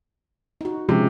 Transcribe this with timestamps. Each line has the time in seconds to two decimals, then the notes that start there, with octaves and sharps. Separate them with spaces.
0.61 D#4 F#4
0.89 C3 F3 G#3 C#4